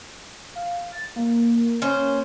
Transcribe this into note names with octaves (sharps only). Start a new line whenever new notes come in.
F5
A6
A#3
C#4 C5